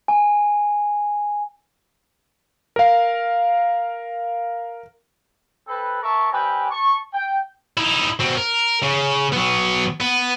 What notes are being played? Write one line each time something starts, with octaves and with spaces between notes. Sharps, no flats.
G#5
A#4 F5
C4 A4 B4
A#4 E5 A5 C#6
G3 C4 G4 B4 G#5
A5 C#6
G5
D#4 E4
B2 C4
A#4
C#3
F#3 B3
B3